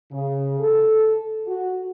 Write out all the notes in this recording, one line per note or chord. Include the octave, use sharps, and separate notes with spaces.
C#3
A4
F#4